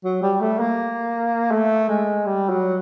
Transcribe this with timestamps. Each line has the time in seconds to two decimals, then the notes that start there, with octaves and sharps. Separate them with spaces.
0.05 F#3
0.22 G3
0.41 A3
0.59 A#3
1.51 A3
1.89 G#3
2.26 G3
2.49 F#3